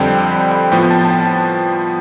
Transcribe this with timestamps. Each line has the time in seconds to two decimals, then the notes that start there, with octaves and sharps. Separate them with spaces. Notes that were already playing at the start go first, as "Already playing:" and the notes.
Already playing: F2 D3 G3 C4 G5
0.31 B5
0.52 G5
0.72 A2 F3 B3 G5
0.91 A5
1.05 A5
1.11 G5